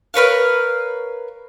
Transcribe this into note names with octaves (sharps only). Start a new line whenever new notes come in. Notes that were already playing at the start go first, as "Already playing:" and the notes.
A#4 B4 C#5 F5